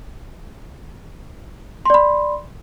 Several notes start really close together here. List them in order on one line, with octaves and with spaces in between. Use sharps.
C6 D5 B5